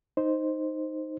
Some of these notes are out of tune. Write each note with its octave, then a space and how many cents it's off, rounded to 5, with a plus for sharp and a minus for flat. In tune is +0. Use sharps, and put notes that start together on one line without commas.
D#4 +0 C5 +0